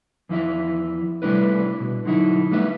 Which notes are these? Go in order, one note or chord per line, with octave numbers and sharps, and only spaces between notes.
E2 F3 E4 E5
C3 G3 A3 D4 E4 B4
B2
D3 F#3 D#4 E4
G3 A3 B3 D4 E5